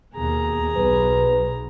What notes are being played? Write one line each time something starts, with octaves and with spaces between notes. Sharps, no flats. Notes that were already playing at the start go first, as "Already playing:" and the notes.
D#2 B2 G#4 A#5
B1 B2 B4